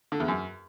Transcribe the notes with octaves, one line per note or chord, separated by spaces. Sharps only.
D3
E2
F#2